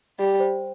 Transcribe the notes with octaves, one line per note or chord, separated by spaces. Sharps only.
G3 G4
C5